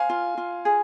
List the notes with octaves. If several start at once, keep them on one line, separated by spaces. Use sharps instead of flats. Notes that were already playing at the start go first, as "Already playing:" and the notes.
Already playing: C5 F5 G#5
F4
F4
G#4